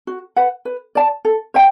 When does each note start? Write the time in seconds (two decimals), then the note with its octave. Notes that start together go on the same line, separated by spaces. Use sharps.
0.07 F#4
0.36 B4 F#5
0.65 B4
0.95 D5 A5
1.25 A4
1.54 C5 E5 G5